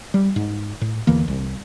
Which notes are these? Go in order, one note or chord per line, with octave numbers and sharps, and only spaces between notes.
G3
G#2
A2
E2 D3 E3 A#3
C2